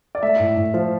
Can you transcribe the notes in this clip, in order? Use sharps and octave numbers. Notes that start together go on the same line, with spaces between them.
D5
A3 E5
A2
A2
F3